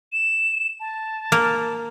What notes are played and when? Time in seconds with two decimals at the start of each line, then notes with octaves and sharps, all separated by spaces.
0.13 E7
0.80 A5
1.32 A#3